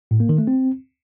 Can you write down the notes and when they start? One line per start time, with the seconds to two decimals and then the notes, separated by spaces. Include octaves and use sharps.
0.11 A2
0.20 A#3
0.29 D#3
0.38 A3
0.47 C4